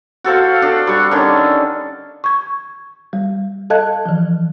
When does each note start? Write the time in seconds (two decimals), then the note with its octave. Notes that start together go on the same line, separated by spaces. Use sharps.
0.24 F#4 A4 C5 F5
0.62 D4 A4
0.87 G3 C#6
1.11 D3 D#3 C#4
2.24 C#6 G#6
3.13 G3
3.70 A4 D#5 F5 A5 F#6 G#6
4.06 E3 F3